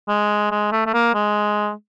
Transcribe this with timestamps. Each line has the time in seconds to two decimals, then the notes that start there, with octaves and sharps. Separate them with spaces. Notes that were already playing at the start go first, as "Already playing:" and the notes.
0.08 G#3
0.51 G#3
0.72 A3
0.86 A3
0.94 A#3
1.14 G#3